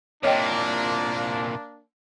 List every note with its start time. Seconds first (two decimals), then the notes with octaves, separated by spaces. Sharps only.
0.23 C2 A#2 A#3 D4 C#5 D#5 G5